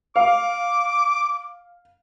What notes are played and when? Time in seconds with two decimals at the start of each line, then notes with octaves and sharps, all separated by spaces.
0.16 F5 D6